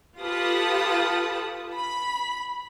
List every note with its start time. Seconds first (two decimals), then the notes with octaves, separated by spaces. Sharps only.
0.21 F4 G4 A4 B4 D#6
1.74 B5